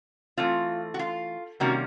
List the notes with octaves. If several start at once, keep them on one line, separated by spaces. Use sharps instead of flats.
E3 A3 C4 F4
F#4
F4
C3 D#3 G3 A#3 C#4 F#4